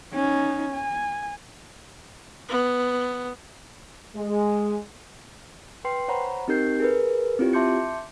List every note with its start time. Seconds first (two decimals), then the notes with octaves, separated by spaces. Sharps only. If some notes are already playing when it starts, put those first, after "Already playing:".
0.13 C#4 D#4
0.75 G#5
2.48 B3
4.15 G#3
5.85 B4 G5 C6 C7
6.08 C5 C#5 F#5 A#5 B5
6.48 C4 D#4 G4 A#4 G6 C7
6.80 G#4 A#4 B4
7.39 C4 E4 F4 G4 C#5
7.53 E5 A5 C6 D6 G6 C#7